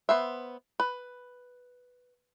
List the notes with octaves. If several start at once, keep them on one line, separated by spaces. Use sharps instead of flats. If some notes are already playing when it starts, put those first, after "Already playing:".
B3 C5 E5
B4